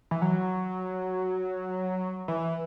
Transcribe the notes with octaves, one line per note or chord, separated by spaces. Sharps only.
E3
F#3
E3